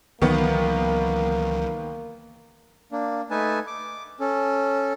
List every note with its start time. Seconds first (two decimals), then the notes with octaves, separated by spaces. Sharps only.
0.22 C#2 D#3 E3 F#3 A#3 B3
2.92 A#3 D4
3.30 A3 D#4 A4 B4 G#5 A5
3.67 D6
4.20 C#4 A4